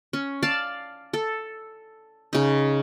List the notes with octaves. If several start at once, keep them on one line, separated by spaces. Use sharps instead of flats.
C#4
D5 F5 A5
A4
C#3 D#4